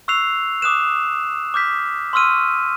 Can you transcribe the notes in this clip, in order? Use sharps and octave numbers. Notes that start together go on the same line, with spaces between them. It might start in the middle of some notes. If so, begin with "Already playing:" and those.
C#6 E6 F#6 C7 F7
D6 D#6 F#6 E7
D6 F6 G6 B6
C6 C#6 E6 F6 D#7